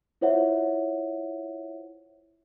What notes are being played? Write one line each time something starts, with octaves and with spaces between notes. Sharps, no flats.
E4 F4 C5 C#5 E5 F#5